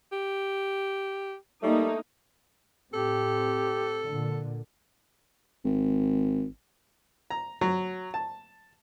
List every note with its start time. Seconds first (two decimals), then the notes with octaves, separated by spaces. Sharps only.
0.12 G4
1.63 G3 A3 A#3 D#4
2.94 A2 C4 G4 A4
4.04 A#2 D3
5.65 G#1
7.30 A#5
7.61 F#3
8.14 A5